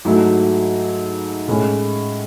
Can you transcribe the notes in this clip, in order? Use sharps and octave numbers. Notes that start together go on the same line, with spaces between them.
G#2 F#3 A3 E4
A2 G#3 C#4